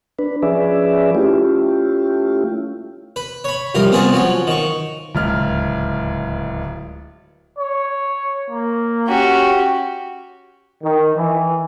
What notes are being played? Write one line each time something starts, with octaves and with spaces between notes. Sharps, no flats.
D4 B4
F3 C#4 G#4 B4 D5 E5
A3 C#4 E4 F4 G4
B4
C#5 B5
C2 F2 A#4 F5
B3 C4 G#4 C#5 A5
F3 F#3 C#5
D#3 C#6
D1 C#2 F6
C#5
A#3
C#4 F#4 G4
D#3
E3